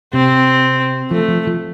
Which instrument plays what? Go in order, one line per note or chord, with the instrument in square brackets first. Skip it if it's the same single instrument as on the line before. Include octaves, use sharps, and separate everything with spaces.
[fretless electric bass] C3 [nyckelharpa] C4
[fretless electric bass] F3 [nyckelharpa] A3
[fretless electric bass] F3
F3